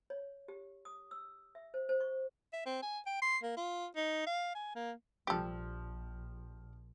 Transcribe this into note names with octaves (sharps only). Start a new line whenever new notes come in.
C#5
G4
D#6
E6
E5
C5
C5
C#6
E5
C4
G#5
G5
C6
A#3
F4
D#4
F5
G#5
A#3
A#1 F3 G3 G4 A4